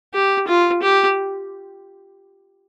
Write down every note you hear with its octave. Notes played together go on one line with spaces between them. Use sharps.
G4
F4
G4